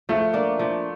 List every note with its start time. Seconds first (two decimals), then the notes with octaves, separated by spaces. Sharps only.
0.09 F3 A3
0.34 A#3 D4
0.59 F3